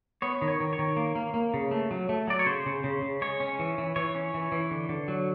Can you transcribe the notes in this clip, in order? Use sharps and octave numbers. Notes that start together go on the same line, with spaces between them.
B3 C#5
D#3
C#5
D#3
C#5
D#3
A#3
A#3
A#3
C#3
A3
F#3
A3
F#3 D5
C#5
C#3 C5
C#3
C#3
C#3
G#3 C#5
C#4
E3
E3
E3 C#5
C#4
E3
E3
D3
D3
F#3